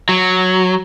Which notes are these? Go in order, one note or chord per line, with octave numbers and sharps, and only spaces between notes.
F#3